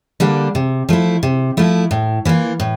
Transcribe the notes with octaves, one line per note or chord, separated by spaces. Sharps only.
D3 G3 A#3 D4
C3
F3 A3 E4
C3
F3 A3 E4
A2
E3 A#3 F4
A2